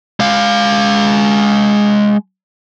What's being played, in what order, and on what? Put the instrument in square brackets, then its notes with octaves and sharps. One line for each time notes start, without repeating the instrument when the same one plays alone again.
[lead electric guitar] G#3 F5